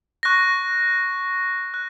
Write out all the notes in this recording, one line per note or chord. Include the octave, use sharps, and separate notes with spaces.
C#6 F#6 A#6
F#6